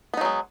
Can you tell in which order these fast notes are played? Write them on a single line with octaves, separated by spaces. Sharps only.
B3 D#4 F#3 G#3